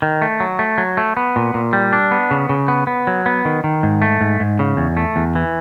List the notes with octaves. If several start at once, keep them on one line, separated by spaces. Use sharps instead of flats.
D#3
A3
F#3
A3
F#3
A3
B3
A#2
A#2
G3
D4
B3
C#3
C#3
B3
B3
F#3
B3
D#3
D#3
G#2
A3
G#2
G#2
C#3
E2
A3
E2
E3